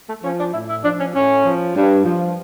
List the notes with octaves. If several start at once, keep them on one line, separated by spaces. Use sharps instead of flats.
A3
F3 C#4
D4
A2 E4
E4
F3 D4
C#4
A2 C#4
F3
G2
F3